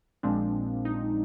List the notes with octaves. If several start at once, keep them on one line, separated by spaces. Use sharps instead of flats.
A#1 A#2 F3 G#3 C4 D4
D#4